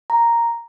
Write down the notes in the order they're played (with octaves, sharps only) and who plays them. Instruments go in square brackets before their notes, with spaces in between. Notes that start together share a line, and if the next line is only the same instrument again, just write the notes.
[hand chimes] A#5